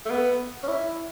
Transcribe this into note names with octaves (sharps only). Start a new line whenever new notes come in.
A3
B3
C#4
E4